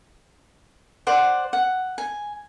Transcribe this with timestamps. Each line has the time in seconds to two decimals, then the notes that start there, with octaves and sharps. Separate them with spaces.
1.07 C5 D5 F#5
1.53 F#5
1.98 G#5